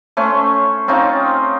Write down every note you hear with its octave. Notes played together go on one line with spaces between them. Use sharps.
A3 C#4 C5
C4 C#4 D#4 F4